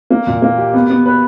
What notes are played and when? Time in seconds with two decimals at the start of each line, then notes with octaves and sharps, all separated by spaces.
0.10 A#3
0.27 A#2
0.42 A#3
0.58 G4
0.74 B3
0.90 B3
1.06 B4